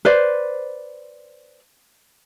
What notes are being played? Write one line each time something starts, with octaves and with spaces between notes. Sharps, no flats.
B4 C5 D5